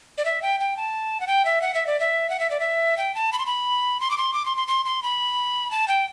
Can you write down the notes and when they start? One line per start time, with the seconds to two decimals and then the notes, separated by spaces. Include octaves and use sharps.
0.18 D5
0.25 E5
0.42 G5
0.60 G5
0.77 A5
1.20 F#5
1.27 G5
1.45 E5
1.62 F#5
1.74 E5
1.87 D5
2.00 E5
2.30 F#5
2.40 E5
2.51 D5
2.60 E5
2.97 G5
3.15 A5
3.32 B5
3.39 C6
3.46 B5
4.00 C6
4.11 D6
4.18 C6
4.34 D6
4.45 C6
4.57 C6
4.68 C6
4.85 C6
5.03 B5
5.71 A5
5.88 G5